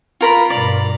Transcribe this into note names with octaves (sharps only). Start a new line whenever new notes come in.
F4 A#4 B5
G2 B2 D5